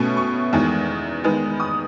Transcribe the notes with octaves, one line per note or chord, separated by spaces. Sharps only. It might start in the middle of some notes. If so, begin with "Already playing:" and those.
Already playing: B2 A3 C#4 A5
C#6
E2 D#3 G#3
D#3 G#3 B3
D#6